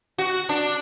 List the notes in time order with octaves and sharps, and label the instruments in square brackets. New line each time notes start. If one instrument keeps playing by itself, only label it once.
[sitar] F#4
D4